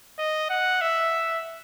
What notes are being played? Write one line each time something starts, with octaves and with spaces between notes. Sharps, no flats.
D#5
F#5
E5